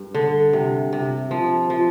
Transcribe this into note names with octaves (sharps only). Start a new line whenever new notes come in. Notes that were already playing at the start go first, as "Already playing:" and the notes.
Already playing: G2
D3
C3
C3
F3
F3